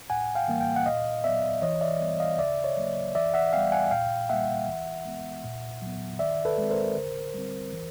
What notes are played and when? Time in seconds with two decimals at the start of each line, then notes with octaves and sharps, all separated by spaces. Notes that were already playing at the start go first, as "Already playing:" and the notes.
0.10 A2 F#5 G#5
0.35 F5 G5
0.48 E3 G3 A#3
0.61 F5 G5
0.76 F#5
0.86 A#2 D#5 F5
1.24 F#3 B3 D5 E5
1.62 E3 C#5 D#5
1.81 D5 E5
2.00 G3 B3
2.20 D#5 F5
2.38 C#3 D5 E5
2.64 C#5 D#5
2.77 F#3 A#3
3.15 E3 D5 E5
3.34 E5 F#5
3.53 G3 B3 F5 G5
3.72 F#5 G#5
3.91 A#2 F5 G5
4.30 G3 A#3 E5 F#5
4.67 E3
5.05 G#3 B3
5.44 A#2
5.82 F#3 B3
6.19 D#3 D5 E5
6.45 A4 B4
6.58 G#3 C4
6.71 A#4 C5
6.96 D3
7.34 G3 C4
7.73 E3